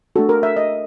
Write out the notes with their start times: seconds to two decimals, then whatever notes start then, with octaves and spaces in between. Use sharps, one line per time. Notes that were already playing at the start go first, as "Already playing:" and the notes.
0.16 A3 D4 F#4 A4
0.29 A#4
0.43 E5
0.57 D#5